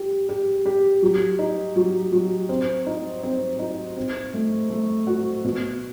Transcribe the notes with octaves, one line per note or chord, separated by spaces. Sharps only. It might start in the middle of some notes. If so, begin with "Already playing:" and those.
Already playing: G4
G4
G4
F#3
D#4
F#3
F#3
C4
D#4
C4
D#4
C4
A3
A3
F#4
B2